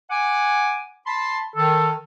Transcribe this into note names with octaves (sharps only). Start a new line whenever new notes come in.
F#5 G#5 D6
A5 B5 C6
D#3 A4